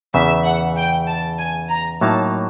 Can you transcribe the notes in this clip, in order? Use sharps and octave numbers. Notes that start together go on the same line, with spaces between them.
E2 C#3 E3 E5
F#5
G5
A5
G#5
A#5
A2 F#3 A#3 D#4 A5